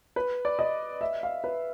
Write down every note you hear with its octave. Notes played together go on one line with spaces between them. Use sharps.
B4
D5
D#5
E5
F5
B4